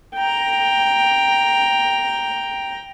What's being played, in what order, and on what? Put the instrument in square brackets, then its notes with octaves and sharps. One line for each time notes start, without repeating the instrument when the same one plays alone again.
[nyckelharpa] G5 A#5